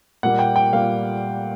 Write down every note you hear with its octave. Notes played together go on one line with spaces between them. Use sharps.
A#2 G3 A#3 F#5
G5
G5
A#2 G3 A#3 F5